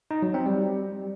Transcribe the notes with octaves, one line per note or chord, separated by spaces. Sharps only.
D#4
F#3
C4
G3